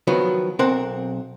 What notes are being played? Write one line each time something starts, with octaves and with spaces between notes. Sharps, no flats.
D#3 F3 F#3 B3
B1 C4 A#4 C5 F#5